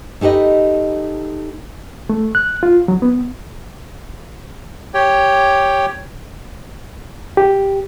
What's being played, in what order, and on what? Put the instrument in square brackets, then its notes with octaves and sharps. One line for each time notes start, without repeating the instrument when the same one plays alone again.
[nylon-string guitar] A3 D#4 G4 B4 D#5
[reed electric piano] A3
F#6
F4
F#3
B3
[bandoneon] G4 C#5 G5
[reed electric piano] G4